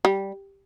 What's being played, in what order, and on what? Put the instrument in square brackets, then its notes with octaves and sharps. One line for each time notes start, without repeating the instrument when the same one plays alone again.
[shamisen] G3